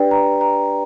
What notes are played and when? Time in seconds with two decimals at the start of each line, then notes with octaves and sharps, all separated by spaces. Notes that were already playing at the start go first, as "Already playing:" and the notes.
Already playing: D4 G4 B4 D5 G5
0.11 A#5
0.41 A#5